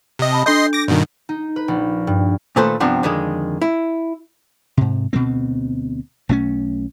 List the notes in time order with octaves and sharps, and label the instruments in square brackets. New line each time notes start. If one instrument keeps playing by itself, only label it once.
[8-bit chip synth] C3 D#5
[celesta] A5 B5
[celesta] D4 A4 G6 [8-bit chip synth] D#5 C6 C7
[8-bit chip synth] D6 A#6
G2 B2 D#3
[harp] D#4
B4
A#1
G2
[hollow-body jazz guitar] A#2 D#3 A3 A4 B4 C5
G2 C3 F3 B3 C4 D4
F2 D3 D#3 G#3
E4
[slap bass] G#2 C3
D2 B2 A#3 C4
B1 A3 C4 C#4